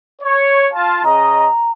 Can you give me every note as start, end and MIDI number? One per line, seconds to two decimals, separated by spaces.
0.22 0.68 73
0.73 1.01 65
0.73 1.01 81
1.04 1.48 49
1.04 1.48 75
1.04 1.71 82